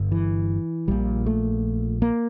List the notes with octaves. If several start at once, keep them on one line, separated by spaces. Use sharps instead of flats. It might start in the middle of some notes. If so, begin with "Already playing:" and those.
Already playing: G1 G2
E3
A#1 A#2 G3
A3
A#3